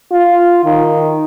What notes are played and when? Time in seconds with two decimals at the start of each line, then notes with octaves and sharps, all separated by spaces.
0.11 F4
0.65 D#3